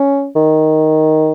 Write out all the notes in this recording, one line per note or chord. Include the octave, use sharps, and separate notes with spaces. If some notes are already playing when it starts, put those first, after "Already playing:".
Already playing: C#4
D#3